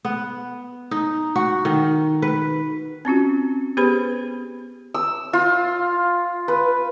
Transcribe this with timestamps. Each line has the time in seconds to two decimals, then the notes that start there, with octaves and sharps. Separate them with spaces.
0.05 B3
0.91 D#4
1.36 F#4
1.65 D#3
2.22 B4
3.05 C4 C#4 F4 F#4
3.77 B3 G4 G#4 B4 C5 B5
4.94 E6
5.33 F4
6.48 B4